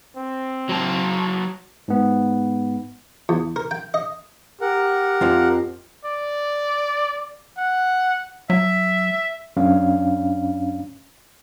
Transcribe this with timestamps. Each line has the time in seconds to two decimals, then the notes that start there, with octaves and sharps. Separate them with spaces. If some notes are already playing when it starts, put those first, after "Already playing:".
0.16 C4
0.69 F#3 A5
1.88 G#2 B3
3.29 E2
3.56 A#4
3.71 G5
3.94 D#5
4.61 G4 A#4 F#5
5.21 F2 F3
6.05 D5
7.58 F#5
8.50 F#3 E5
9.56 F#2 C#4 D4 F5